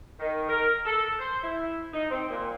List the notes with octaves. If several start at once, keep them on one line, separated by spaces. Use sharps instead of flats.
D#3
A#4
A4
C5
E4
D#4
C4
A#2